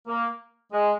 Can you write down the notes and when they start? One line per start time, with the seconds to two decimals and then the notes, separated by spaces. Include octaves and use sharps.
0.07 A#3
0.73 G#3